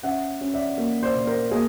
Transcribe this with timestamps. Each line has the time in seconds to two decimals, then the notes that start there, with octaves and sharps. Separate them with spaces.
0.03 C#4 E5 F#5
0.41 C#4
0.54 D5 E5
0.78 A#3
1.03 C5 D5
1.15 A#2
1.27 A#4 C5
1.51 A#3 G#4 A#4